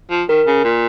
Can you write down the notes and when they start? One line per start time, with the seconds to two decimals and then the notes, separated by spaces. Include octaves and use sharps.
0.11 F3
0.29 D#3 A#4
0.47 C#3
0.64 A#2